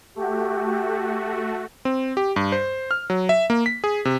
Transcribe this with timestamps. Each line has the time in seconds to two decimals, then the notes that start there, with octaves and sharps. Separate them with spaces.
0.16 A3 F#4 G4
1.85 C4
2.17 G4
2.36 G2
2.52 C5
2.91 F6
3.10 F#3
3.29 E5
3.50 A#3
3.66 B6
3.84 G#4
4.05 C3